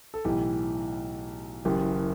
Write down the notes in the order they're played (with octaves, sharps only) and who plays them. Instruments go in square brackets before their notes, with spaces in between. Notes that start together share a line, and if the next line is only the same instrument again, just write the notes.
[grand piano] A4
B1 A2 E3 G4
F#1 F#2 E3 G4